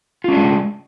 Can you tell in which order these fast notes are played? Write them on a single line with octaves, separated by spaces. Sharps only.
F4 C#4 D4 G#3